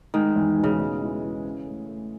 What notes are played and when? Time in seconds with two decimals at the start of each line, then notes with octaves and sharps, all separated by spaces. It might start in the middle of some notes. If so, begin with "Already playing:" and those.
0.14 D#3 G#3
0.36 E2
0.57 B2
0.64 C#3
0.80 G#3
1.02 E3
1.23 E3
1.44 C#4
1.67 A3
1.88 A3